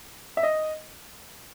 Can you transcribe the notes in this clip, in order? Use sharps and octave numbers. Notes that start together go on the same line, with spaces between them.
E5
D#5